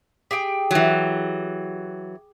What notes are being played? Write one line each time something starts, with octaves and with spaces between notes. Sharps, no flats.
G4 G#4 G5
E3 F#3